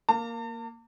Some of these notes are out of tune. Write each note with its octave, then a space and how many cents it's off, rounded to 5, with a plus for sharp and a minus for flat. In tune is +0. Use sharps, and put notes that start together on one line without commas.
A#3 +0 A5 +45